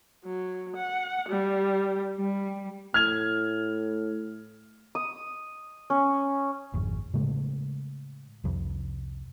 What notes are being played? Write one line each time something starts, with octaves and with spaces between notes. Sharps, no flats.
F#3
F#5
G3
G3
A2 F6 G#6 F7
D#6
C#4
G#1 F2
A2 C#3 G#3 A3
C2 F2